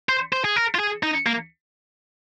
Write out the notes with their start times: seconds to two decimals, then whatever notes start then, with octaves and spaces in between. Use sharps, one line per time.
0.09 C5
0.33 C5
0.44 G#4
0.56 A#4
0.75 F4
0.79 G#4
1.03 D#4
1.26 A#3